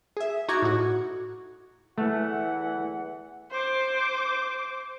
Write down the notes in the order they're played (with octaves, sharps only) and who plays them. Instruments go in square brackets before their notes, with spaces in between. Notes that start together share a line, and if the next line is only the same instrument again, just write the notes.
[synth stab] G#4 E5
D#4 F#4 C#6 D6 G#6
A2 F#4
[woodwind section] E2 E3 F#5 [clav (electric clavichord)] A3
[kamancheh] C5 D6